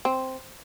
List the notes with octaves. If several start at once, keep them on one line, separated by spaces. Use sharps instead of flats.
C4